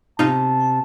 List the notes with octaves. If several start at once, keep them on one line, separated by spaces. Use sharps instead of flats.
C3 D#4 F4 A5